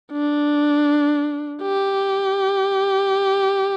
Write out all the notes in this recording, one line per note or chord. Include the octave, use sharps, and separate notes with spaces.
D4
G4